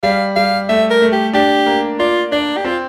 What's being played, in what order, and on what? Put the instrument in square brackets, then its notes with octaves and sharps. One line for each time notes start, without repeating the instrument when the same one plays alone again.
[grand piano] G3 [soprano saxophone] F5
[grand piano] G3 [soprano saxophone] F5
[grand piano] A3 [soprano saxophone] E5
[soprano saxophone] A#4
[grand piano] A3
[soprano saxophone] G4
[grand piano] D4 [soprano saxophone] G4
[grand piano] A#3
[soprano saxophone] F4 [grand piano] D5
[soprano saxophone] D4 [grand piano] D5
[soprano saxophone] G4
[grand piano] C4 [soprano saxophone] F4